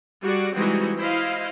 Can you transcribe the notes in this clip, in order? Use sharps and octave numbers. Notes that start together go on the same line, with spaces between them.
G3 F#4 G#4 D5
E3 G3 G#3 C4 D#4 F#4
E4 C5 D#5 F5